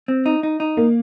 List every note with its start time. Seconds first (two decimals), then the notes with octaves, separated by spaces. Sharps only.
0.08 C4
0.26 D#4
0.43 D#4
0.60 D#4
0.77 A#3